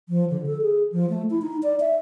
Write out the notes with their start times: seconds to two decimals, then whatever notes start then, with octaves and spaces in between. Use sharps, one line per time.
0.09 F3
0.30 D3
0.46 A4
0.62 G#4
0.92 F3
1.10 A3
1.30 E4
1.42 D#4
1.63 D5
1.80 E5